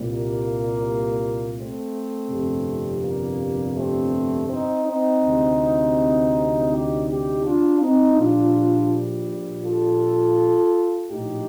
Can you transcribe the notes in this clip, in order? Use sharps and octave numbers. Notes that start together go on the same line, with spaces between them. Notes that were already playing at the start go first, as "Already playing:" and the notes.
Already playing: C2 A#2 G3
A#3
A3 C4
G1 F2 C3 G3
A#3
A3 C4
C4 D#4
C4 D#4
D2 C3 G3
D#4 G4
D#4 G4
D4 F4
C4 D#4
A#1 A#2 G3 D4 F4
F4 A4
A#1 A2 F3 D#4 G4